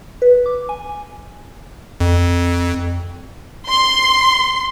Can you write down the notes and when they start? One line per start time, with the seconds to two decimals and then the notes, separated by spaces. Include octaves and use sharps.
0.22 B4
0.46 D6
0.69 G#5
2.00 F2
3.70 C6